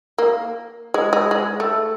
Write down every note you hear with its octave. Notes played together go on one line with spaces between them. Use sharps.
A#3
G#3
G#3
G#3
A3